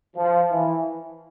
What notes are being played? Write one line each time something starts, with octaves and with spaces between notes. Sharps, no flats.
F3
E3